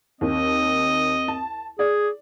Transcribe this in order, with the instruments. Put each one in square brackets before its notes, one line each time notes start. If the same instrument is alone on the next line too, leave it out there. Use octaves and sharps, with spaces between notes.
[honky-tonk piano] D#2 [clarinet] C4 [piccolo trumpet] D#5
[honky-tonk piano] A5
[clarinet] G#4 [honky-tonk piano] D5